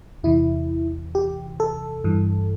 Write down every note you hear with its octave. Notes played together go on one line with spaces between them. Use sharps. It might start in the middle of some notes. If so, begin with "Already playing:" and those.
E2 C3 E3 E4
G4
A4
G2 E3